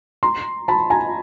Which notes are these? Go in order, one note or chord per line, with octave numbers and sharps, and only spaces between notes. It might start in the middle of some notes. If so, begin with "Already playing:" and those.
A#5 C6
A5 B5
G#5 A#5